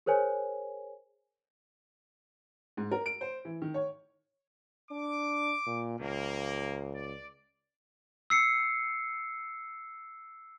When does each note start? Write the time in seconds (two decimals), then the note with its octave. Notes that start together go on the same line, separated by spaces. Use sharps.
0.06 G#4 A#4 C5 C#5 G#5
2.77 G#2
2.91 A#4
3.06 D7
3.21 C5
3.45 E3
3.62 D#3
3.74 C#5
4.91 D4 D6
5.67 A#2
6.00 C#2 A#3
6.94 D5
8.30 E6 C7 C#7